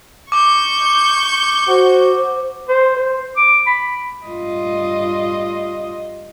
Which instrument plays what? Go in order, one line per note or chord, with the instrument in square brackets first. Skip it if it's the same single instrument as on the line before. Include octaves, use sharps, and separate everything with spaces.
[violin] C#6 G6 [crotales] D6
[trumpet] F#4 [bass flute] C5
[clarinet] C5
C5
D6
B5
[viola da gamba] G2 F4 D#5